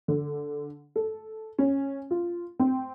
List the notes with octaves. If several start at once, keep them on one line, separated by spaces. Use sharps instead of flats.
D3
A4
C#4
F4
C4